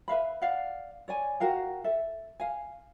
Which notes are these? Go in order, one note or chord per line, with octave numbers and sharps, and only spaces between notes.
B4 E5 F5 B5
D5 F5 F#5
C#5 D5 G#5
F#4 A#4 F5 G5
A4 E5
F5 G#5